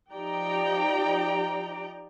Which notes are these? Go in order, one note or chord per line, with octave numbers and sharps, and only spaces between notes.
F3 D#4 G4 D5 G5 A#5